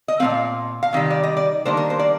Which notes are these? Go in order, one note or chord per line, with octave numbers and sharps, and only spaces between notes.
D#5
A#2 A3 C4 F5
F5
C3 D#3 G3
D5
D#5
D5
D#3 G3 A#3 D4 C5
A#4
C5
D5